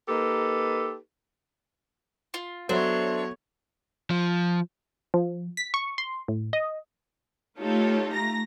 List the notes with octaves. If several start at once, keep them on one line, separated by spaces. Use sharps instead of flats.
A#3 D#4 G4 A4 B4
F4
F#3 B3 D4 A4 C5 C#5 E5
F3
F3
B6
C#6
C6
A2
D#5
A3 D#4 F4 G4 A4 C#5
A3 A#5 A#6